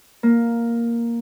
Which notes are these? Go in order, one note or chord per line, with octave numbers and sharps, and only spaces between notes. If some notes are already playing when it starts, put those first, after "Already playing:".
A#3